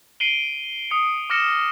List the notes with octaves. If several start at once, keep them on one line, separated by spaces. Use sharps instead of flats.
C7 D7 D#7 F#7 G7
D#6 C#7
D6 F6 A#6 C#7 E7